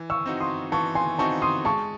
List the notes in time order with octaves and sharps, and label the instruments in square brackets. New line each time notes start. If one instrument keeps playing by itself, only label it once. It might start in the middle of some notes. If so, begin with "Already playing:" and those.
Already playing: [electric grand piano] E3
[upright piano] C#6 E6
[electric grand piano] C4 D#4 F#4
[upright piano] C6 D#6
[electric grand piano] E3 [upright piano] A5 C#6
[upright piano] G#5 C6
[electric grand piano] C4 D#4 F#4 [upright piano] A5 C#6
[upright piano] C6 D#6
[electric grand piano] G#3 [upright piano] A5 C#6